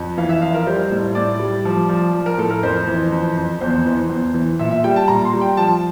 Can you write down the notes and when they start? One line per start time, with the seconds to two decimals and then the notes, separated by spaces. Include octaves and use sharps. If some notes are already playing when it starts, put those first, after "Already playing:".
Already playing: F2
0.17 E3 F5
0.29 E5
0.42 F2 F5
0.54 A#4
0.66 G3 C5
0.91 A2
1.15 A2 D5
1.40 G3
1.65 F3
1.89 F3
2.13 F3
2.26 A#4
2.38 A2 A4
2.51 A#4
2.63 F2 C5
2.87 E3
3.11 F2
3.37 F2
3.61 E2 C5
3.86 E3
4.09 E2
4.34 E3
4.59 A#2 E5
4.71 E5
4.84 G3 G5
4.96 A5
5.08 A#2 A#5
5.25 C6
5.33 G3
5.42 G5
5.57 F3 A5